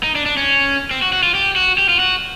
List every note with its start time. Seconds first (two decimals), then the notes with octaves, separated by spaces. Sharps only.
0.03 D#4
0.15 D4
0.26 D4
0.37 C#4
0.91 C4
1.02 F#4
1.13 F#4
1.23 F4
1.35 G4
1.56 F#4
1.78 G4
1.89 F4
1.99 F#4